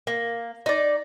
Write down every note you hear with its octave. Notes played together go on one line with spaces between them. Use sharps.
A#3
D#4 D5